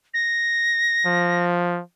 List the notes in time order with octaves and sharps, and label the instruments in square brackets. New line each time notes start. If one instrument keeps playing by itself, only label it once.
[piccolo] A#6
[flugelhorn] F3